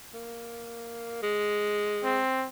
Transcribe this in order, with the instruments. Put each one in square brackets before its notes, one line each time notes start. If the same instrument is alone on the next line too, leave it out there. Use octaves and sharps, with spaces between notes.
[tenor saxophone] A#3
G#3
[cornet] C4